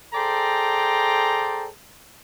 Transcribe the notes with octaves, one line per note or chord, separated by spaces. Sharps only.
G#4 A4 C5 D5 G5 A#5